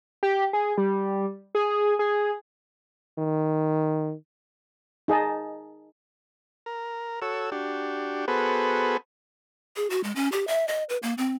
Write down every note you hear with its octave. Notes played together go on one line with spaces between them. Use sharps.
G4
G#4
G3
G#4
G#4
D#3
D#4 G#4 D#5 A5
A#4
F#4 A4 C#5 E6
D4 F#4 G4
B3 F#4 G#4 A4 B4 C5
G#4
F#4
G#3
C#4
G4
E5
D#5
B4
A#3
C4